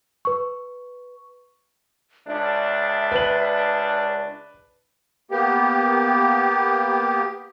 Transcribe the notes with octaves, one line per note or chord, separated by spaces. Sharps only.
B4 C#6
C#2 D4 E5
B4 F#7
A#3 B3 G4